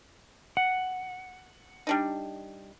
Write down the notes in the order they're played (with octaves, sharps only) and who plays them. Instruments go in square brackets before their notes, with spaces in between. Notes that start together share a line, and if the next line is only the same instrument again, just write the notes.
[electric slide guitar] F#5
[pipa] G3 D4 D#4